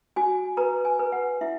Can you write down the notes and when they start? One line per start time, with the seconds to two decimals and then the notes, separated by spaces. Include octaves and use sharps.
0.16 F#4 G#5
0.57 B4 A#5
0.85 G#5
0.99 B4
1.12 F#5
1.41 E4 E5